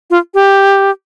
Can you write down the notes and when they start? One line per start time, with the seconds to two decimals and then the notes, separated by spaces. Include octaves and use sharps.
0.10 F4
0.34 G4